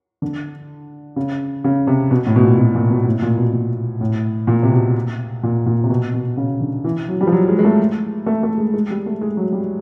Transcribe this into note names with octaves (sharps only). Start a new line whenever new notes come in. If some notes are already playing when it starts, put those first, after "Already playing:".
D3
C#3
C#3
C3
B2
A2
B2
A#2
B2
A#2
B2
A2
A#2
B2
A#2
A2
A#2
C3
B2
A#2
A#2
C3
B2
B2
C#3
D3
E3
F#3
G3
F3
F#3
G#3
G#3
A3
A3
A3
G#3
G#3
G3
A3
G#3
F#3
G3